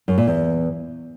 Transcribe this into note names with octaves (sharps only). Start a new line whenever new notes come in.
F#2
A#2
E2